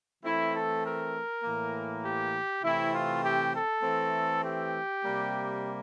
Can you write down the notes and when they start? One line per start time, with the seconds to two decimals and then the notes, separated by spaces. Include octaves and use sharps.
0.24 E3 A3 C4 E4
0.54 A4
0.84 A#4
1.43 A2 E3 A#3
2.04 G4
2.63 C3 E3 A3 C4 E4
2.93 F4
3.23 G4
3.54 A4
3.83 E3 A3 C4
4.43 G4
5.03 C3 G3 A#3